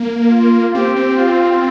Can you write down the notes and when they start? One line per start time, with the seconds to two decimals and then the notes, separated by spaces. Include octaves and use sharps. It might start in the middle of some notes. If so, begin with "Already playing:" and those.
Already playing: A#3
0.30 F4
0.74 C4 G4
0.96 C4
1.17 F4